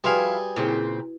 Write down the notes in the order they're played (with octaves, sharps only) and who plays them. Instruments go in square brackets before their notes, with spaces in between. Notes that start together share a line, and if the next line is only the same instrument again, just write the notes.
[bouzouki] F3 E4 F5 [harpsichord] G3 G#4 [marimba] F#4 B4 C6
[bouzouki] A#2 C#3 C4 [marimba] E4